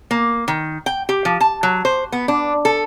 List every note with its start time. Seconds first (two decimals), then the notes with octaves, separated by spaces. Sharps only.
0.11 A#3
0.48 D#3
0.86 G5
1.09 G4
1.25 F3
1.41 A5
1.63 F#3
1.85 C5
2.12 B3
2.28 D4
2.65 A4